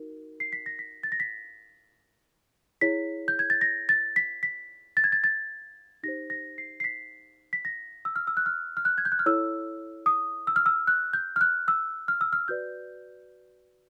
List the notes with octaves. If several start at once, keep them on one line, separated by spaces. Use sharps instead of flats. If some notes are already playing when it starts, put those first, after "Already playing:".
Already playing: D#4 F#4 A#4
C7
B6
A#6
B6
A6
A#6
B6
E4 G#4 C#5 B6
G6
G#6
A6
A#6
A6
B6
B6
A6
G#6
A6
A6
D#4 G4 C5 A#6
A#6
C7
C7
B6
B6
A#6
E6
F6
E6
F#6
F6
F6
F#6
G#6
G6
F#6
F6
E4 A4 C#5 E6
D#6
E6
F6
E6
F#6
G6
F6
F#6
E6
F6
E6
F6
F#4 B4 D5 G6